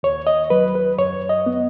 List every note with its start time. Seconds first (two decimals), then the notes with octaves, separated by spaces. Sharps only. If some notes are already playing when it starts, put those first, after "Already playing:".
0.03 D#2 C#5
0.27 D#5
0.50 F#3 B4
0.75 B4
0.98 F#2 C#5
1.29 D#5
1.46 B3